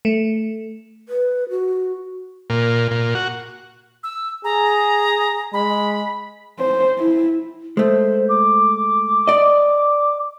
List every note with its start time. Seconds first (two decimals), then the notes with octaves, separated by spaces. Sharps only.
0.05 A3
1.09 B4
1.50 F#4
2.50 A#2
2.91 A#2
3.15 F#4
4.03 E6
4.44 G#4 A#5
5.53 G#3 B5
6.59 C5
6.98 E4
7.77 G#3 A3 C5
8.29 D6
9.28 D5 D#5